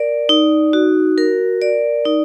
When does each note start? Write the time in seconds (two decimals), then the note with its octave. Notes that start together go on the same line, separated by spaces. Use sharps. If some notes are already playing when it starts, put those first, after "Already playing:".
Already playing: A#4 D5
0.29 D#4
0.73 F#4
1.18 A#4
1.62 D5
2.05 D#4